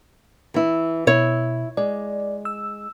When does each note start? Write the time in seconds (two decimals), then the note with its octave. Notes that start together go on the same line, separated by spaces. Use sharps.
0.54 E3 E4
1.07 B2 E4 C#5
1.77 G#3 D5
2.45 E6